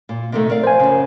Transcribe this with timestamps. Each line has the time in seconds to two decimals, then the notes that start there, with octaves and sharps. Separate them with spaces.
0.09 A#2
0.32 C3 D#3 A3
0.50 A#4 D5 F5
0.63 F3 C5 G#5
0.80 F#2 C#3